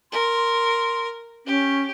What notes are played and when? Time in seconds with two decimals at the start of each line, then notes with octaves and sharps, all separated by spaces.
0.12 A#4 C6
1.46 C#4 G4